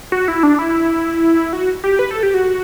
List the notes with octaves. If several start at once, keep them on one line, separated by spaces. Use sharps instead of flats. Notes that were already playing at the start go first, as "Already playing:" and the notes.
F#4
E4
D4
E4
F#4
G4
B4
A4
G4
F#4